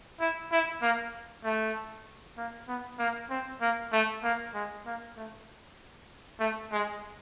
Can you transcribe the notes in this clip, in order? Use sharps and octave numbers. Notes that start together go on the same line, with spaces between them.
E4
E4
A#3
A3
A#3
B3
A#3
C4
A#3
A3
A#3
G#3
A#3
A3
A3
G#3